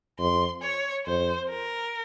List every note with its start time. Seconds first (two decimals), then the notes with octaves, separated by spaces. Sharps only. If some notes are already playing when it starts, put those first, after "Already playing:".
0.19 F2 C6
0.62 C#5
1.06 F2 C5
1.49 A#4